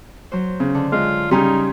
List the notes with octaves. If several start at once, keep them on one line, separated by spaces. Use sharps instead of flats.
F#3 C5
C#3
D3
G#3 F4
C#3 G3 C#4 D#4 G#5 C6